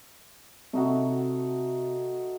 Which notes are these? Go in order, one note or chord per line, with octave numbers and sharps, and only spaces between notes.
C3 A3 D#4 F#4